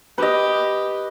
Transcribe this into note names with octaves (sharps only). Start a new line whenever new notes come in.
G4 B4 D#5